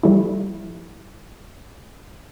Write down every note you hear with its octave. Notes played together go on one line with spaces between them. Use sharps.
F3 G3 A3 E4